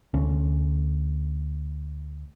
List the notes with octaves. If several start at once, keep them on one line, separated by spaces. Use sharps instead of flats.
D2 C#4